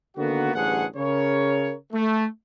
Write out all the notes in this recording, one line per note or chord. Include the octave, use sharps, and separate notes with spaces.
D3 D#3 A#3 B3 F#4
A1 D2 G2 G#4 F#5
C#3 A#4 C#5
A3